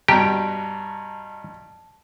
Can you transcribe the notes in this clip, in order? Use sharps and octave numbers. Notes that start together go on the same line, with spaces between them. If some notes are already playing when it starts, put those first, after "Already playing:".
G2 B2 G4 A5 A#5